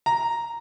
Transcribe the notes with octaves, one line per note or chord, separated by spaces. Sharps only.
A#5